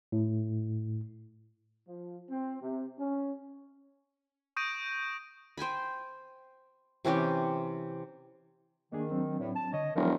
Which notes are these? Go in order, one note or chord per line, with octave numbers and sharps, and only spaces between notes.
A2
F3
C4
C3
C#4
C#6 D#6 G6 A#6 D7 D#7
C5 G5 G#5 B5
C3 E3 C#4 G4
D#3 A#3 D4 G#4
F#3 C4 D4
E2 A2
A5
D3 C#5 D#5
E1 F3 F#3 A3 C#4 D#4 A#4